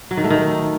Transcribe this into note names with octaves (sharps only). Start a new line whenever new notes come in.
F#3
D#3
A3
D#3